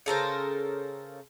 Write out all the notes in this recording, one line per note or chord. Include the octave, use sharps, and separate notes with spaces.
C#3 A4 A#4 C5